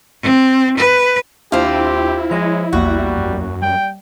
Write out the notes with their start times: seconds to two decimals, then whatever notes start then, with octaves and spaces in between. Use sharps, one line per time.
0.22 C4
0.77 B4
1.52 D#2 C4 D4 E4 F4 G4
2.31 F3 G#3 C#5 D#5
2.73 A#1 E2 G3 A#3 F#4
3.17 F#2
3.62 G3 G5